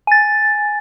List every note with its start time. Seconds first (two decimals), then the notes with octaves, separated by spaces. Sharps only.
0.07 G#5 A6